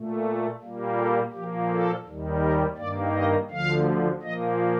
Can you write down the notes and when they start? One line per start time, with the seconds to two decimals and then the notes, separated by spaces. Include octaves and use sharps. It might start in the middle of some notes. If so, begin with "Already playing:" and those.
Already playing: A#2 A3
0.61 A#2 G3 A#3
0.97 A4
1.33 A#2 F3 A#3 G4
1.70 A4
2.06 D#2 D#3 G3
2.42 A#4
2.77 G2 D#3 A#3 D5
3.14 D#5
3.50 D2 D3 F3 F5
4.22 A#2 F3 A#3 D#5